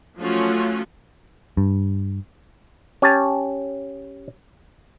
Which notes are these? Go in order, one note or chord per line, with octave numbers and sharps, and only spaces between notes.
F3 F#3 A3 C#4 F4 F#4
G2
C#4 G4 G#5 A5